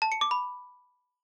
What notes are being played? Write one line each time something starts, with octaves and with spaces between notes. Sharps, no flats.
A5
C#7
D6
B5